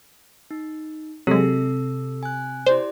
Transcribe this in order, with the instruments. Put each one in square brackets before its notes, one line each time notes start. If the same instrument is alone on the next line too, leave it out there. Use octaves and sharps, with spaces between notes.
[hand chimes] D#4
[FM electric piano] C3 [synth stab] F#3 G#3 [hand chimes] A4 E6
[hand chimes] G#5 F#6
[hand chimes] E4 G4 D5 [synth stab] C5